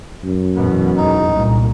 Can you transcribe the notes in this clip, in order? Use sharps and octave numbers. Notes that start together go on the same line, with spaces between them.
F#2
E2 B2 B3
E2 G#2 D#4
C2 A#2